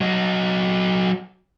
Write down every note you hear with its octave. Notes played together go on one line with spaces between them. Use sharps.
F#3 D#5